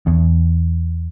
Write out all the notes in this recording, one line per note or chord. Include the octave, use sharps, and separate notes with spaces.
E2